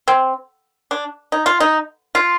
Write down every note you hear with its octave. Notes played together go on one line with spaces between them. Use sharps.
C4
D4
D#4
F4
D#4
F4